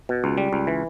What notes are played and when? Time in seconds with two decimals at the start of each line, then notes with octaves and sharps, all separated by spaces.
0.09 B2
0.24 C#2
0.38 G3
0.53 C#2
0.67 E3